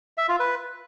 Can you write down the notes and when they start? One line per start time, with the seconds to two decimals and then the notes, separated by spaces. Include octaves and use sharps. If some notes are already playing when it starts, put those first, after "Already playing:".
0.18 E5
0.29 F4
0.40 B4